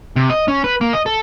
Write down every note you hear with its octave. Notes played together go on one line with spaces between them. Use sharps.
C3
D#5
C#4
B4
A#3
D#5
A4